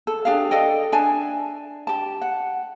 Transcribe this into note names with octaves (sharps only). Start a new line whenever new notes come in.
A4
D4 G4 G#4 F5
A4 D5 D#5 G5
D4 E5 G#5 A5
G4 A5
F#5